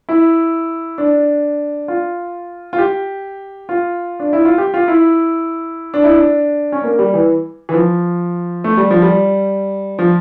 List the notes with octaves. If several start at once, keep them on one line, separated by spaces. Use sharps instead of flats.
E4
D4
F4
F4
G4
F4
D4
E4
F4
G4
F4
E4
D4
E4
D4
C#4
A#3
G3
E3
E3
F3
A3
G3
F3
G3
F3